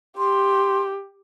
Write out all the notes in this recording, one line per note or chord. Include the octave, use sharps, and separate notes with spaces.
G4 C6